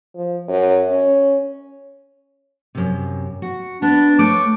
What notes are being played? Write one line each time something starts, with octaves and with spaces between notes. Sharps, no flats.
F3
F#2
C#4
F#2 C3
F#4
B3 D4
A3 C#5 D6